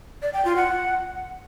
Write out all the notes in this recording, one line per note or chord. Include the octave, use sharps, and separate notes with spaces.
D5
G5
F4
F#5